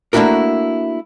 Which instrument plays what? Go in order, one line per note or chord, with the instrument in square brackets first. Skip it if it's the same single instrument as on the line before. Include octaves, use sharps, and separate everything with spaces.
[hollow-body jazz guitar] A3 A#3 D4 E4 F#4 A#4